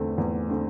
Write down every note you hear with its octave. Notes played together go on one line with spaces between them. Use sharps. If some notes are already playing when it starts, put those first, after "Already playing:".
Already playing: E2 D3 A3 C4
E2
D3 A3 C4